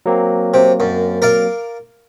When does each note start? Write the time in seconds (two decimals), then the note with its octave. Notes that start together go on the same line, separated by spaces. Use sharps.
0.06 F#3 A#3 C4
0.54 C3
0.80 F#2
1.22 A#4 D5 F5